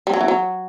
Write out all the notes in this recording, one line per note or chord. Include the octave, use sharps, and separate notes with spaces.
G3
F#3
E3
F#3